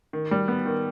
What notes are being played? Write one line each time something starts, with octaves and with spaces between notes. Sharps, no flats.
D#3
G3
B3
D#3